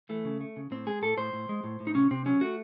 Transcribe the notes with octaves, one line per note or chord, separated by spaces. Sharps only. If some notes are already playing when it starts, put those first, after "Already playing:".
E3 A3
C#3
A3
C#3
A2 C4
G#3 G#4
A2 A4
A2 C5
A2
G#3
A2
A2
D#4
C3 C#4
C3 C4
F#3 C#4
A3 F#4